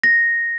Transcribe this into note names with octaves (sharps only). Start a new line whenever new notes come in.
A#6